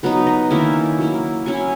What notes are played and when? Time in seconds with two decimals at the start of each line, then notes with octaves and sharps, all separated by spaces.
0.03 F#3 B3 D#4 B4
0.27 D#5
0.50 D#3 A#3 C#4 E4 E5
0.98 F#3 A#3 E4
1.46 F#3 C#4 E4 G#5